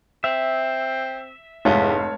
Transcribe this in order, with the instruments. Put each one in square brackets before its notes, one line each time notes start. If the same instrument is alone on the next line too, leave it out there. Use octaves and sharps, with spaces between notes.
[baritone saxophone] C4 [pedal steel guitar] E5
[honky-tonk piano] F1 G#2 [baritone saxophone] E2 [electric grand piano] C#5 F5 A5